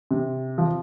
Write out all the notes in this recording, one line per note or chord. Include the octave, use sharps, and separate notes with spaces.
C3
F3